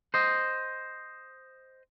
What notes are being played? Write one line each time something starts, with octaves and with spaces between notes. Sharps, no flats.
C5 D#5